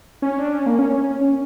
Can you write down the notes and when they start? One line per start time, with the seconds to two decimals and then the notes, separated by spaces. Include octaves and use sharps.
0.22 C#4
0.38 D4
0.53 C#4
0.66 A#3
0.79 C#4
1.21 C#4